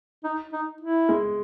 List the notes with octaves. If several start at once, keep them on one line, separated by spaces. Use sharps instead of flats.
D#4
D#4
E4
G#3